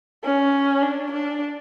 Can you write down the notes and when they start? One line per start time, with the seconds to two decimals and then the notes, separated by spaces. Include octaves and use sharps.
0.24 C#4
0.83 D4
1.12 D4